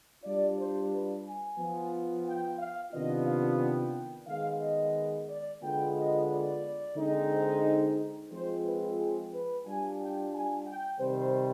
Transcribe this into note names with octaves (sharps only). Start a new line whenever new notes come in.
G3 D4 F4 D5
C5
B4
G#5
F3 B3 F4
G5
F5
C3 D#3 B3 D4 F4 D#5
F5
G5
D#3 G#3 B3 F5
D#5
D5
D3 G#3 B3 F4 G5
D#5
D5
D3 G#3 C4 D#4
C5
F3 G#3 C4 F4 C5
B4
G#4
B4
G3 D4 F4 G#5
G5
G#5
G5
C3 D#3 G3 C5